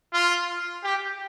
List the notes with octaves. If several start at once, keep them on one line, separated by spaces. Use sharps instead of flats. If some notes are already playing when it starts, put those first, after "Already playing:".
F4
G4